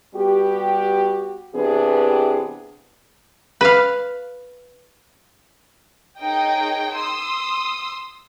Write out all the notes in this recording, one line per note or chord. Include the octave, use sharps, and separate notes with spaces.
G3 B3 F#4 G4
C3 E3 B3 D4 G4 G#4
B4 F5
D#4 G#4 A#4 C#5 D#5 G5
C6 D#6 E6